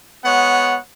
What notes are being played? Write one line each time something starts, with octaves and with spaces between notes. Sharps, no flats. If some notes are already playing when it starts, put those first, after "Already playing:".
G#3 B3 C#5 F#5